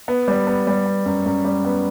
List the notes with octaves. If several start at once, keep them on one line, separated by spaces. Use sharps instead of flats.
B3
G3
B3
G3
B3
F#2
F#2
G3
B3